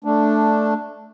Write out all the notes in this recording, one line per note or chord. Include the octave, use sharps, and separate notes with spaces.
A3 D4